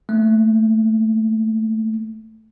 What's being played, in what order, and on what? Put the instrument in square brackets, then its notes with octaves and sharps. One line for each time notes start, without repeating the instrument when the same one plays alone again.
[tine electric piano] A3 A#3